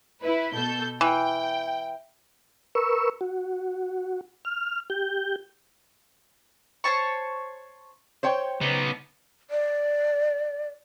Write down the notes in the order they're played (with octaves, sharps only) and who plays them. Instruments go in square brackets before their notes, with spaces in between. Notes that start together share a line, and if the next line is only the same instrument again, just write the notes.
[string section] E4 B4
B2 A4 G6
[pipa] E3 [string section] G5
[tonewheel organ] A#4 B4 C#6 E6
F#4
F6
G4 G6
[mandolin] C5 C#5 A5 C#6
[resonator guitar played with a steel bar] C5 C#5 G5
[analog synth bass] C#3 [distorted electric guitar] B3 D#4
[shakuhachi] D5